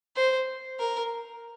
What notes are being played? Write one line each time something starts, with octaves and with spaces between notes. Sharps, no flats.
C5
A#4